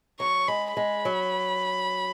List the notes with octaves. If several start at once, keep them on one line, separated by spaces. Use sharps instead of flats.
F#3 C#6
G#3 B5
G#3 B5
F#3